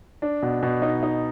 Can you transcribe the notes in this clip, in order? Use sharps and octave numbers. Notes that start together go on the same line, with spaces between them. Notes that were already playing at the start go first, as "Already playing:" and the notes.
D4
B2
B2
D#4
D#4